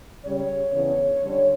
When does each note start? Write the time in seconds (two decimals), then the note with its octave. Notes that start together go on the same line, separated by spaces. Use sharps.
0.24 C#3 G3 C#4 C#5
0.72 C#3 E3 B3 D4 C#5
1.20 D3 G3 C#4